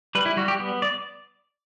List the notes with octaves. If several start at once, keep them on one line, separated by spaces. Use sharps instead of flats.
G3 B4
E4
G3 F#4
G4
B3
D5